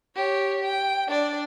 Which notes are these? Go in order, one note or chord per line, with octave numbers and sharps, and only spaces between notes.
G4 C#5
G5
D4 D5